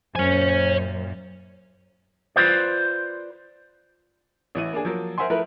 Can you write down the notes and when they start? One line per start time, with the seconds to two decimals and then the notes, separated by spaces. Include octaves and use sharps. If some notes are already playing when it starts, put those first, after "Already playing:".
0.16 F#2 A#2 C5 C#5 G#5
2.36 F4 F#4 B4 C5 D5
4.55 A1 E3 D#7
4.73 A#3 D4 G#4
4.85 F3 F#3 A#3
5.18 A#4 C5 E5 F#5 G#5 C6
5.30 F3 A3 E4 A#4 B4